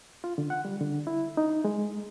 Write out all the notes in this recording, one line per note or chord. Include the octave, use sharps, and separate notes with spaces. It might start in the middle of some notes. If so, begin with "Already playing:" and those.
F4
D3
F#5
G3
D3
E4
D#4
G#3